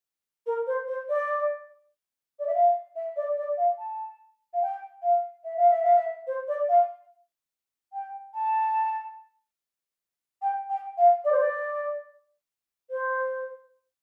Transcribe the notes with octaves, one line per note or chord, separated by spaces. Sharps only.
A#4
C5
C5
D5
D5
E5
F5
E5
D5
D5
F5
A5
F5
G5
F5
E5
F5
E5
F5
E5
C5
D5
F5
G5
A5
G5
G5
F5
D5
C5
D5
C5